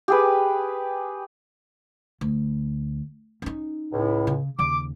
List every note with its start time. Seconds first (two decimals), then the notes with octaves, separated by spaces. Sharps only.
0.08 G4 G#4 B4
2.21 D2
3.42 C#4 D#4
3.93 C#2 A2
4.27 C#3
4.59 D#2 C#3 D6